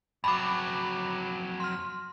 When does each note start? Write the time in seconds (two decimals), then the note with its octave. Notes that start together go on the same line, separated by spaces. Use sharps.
0.24 F2 F#3 B5 D6
1.60 C6 F6